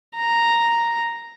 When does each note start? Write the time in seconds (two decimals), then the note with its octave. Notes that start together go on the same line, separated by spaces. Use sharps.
0.16 A#5